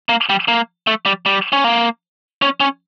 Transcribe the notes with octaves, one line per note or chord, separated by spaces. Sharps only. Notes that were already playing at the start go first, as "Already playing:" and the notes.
A#3
G3
A#3
A3
G3
G3
C#4
A#3
C#4
C#4